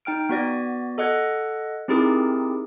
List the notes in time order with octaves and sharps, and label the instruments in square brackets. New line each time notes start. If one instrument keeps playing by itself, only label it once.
[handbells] D#4 G5 F6 D7
B3 F#4 D5 A#6
A4 D#5 F#5 F#6 G#6
C4 D#4 E4 G4 G#4 A#4